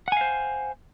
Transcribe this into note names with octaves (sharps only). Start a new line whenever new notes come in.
C5 F5 F#5 G#5